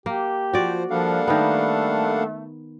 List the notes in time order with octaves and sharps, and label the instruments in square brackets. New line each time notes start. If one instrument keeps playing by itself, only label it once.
[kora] A#3 [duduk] G4
[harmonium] F3 C5 [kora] F#4 D5
[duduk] F3 [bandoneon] G3 D4 F5 [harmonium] A#3 A4 F#5
[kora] D#3 B3 [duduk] A3